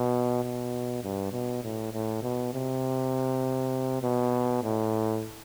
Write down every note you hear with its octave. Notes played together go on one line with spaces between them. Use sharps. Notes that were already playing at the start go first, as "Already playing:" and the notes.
Already playing: B2
B2
G2
B2
A2
A2
B2
C3
B2
A2